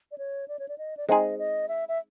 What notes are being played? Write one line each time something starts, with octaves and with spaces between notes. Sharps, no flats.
D5
C#5
D5
C#5
D5
D#5
D5
G#3 C4 D#4 G#4 D#5
D#5
E5
E5